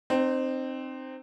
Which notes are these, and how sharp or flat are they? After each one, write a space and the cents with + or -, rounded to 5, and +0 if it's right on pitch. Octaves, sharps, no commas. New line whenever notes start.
C4 +0 D#4 -35